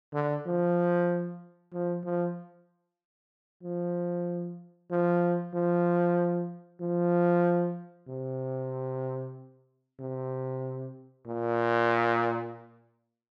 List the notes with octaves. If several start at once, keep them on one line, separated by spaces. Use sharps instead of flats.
D3
F3
F3
F3
F3
F3
F3
F3
C3
C3
A#2